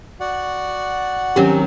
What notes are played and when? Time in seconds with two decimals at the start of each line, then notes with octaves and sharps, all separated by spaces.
0.20 F#4 D5 F#5
1.36 D#3 F#3 C4 C#4 G4